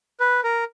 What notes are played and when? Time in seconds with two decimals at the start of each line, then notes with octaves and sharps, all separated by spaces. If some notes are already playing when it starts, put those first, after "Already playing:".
0.20 B4
0.44 A#4